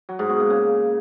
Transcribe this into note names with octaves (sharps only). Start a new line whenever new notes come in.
F#3
G#2
B2
A#3
C#3